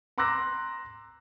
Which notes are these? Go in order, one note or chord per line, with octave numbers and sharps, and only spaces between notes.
A#5 C6 D6 E6 F#6 A#6